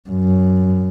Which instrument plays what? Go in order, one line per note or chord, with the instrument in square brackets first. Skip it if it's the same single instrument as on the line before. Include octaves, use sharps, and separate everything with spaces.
[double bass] F#2